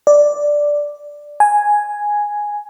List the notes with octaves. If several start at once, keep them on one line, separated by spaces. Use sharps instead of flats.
D5
G#5